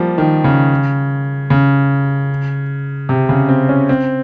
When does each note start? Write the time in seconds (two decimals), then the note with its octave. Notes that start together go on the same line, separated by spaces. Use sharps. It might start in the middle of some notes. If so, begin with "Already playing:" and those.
Already playing: F3 G3 A#3
0.18 D#3
0.44 C#3
1.50 C#3
3.09 C3
3.29 C#3
3.49 C4
3.69 C#4
3.89 C4